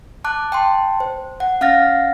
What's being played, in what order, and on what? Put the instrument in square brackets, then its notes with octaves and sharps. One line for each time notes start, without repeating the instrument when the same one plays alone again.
[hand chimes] A5 D6 F#6
G5 A5 C6
C5
F#5
C#4 F5 F#5 F6 A6 A#6